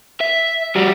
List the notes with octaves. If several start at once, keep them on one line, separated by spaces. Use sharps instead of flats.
E5
G3 F#4